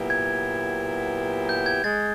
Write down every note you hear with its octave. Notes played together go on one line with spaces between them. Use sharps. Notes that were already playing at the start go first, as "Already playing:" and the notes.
Already playing: A#2 F#3 B3 E4 G4
G#6
G6
G#6
G#3 A6